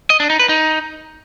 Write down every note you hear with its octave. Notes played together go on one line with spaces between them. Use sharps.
D#5
D4
D#4
B4
D#4